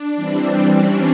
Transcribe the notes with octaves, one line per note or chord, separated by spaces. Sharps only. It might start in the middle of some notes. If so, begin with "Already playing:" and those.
Already playing: D4
E3 G3 C4
C#4